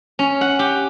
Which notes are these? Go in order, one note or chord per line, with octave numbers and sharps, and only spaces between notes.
C#4
F#5
G4